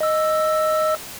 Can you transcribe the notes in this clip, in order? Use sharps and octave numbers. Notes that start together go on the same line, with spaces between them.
D#5 E6